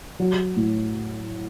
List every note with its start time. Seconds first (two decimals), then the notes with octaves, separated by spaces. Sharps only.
0.20 F#3
0.56 A2